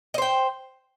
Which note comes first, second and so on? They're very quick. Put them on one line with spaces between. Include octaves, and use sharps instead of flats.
D#5 C5 G5